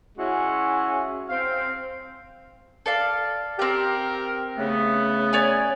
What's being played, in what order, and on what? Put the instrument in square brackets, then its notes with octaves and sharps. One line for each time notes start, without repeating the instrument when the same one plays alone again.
[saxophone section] G#3 C#4 E4 F#4
C4 F5
[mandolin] A4 D5 F5
[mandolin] C4 G5 [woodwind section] G4 A#4
[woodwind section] C#3 A3 B3
[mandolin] C#5 D5 G#5